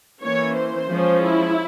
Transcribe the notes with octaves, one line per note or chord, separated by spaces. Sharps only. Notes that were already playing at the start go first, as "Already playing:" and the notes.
E3 A#3 C#4 C#5
C5
F3 G#3 C#4
E4